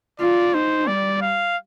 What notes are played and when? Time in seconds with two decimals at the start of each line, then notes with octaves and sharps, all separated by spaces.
0.20 F4 D5
0.54 D#4 C5
0.87 G3 D5
1.22 F5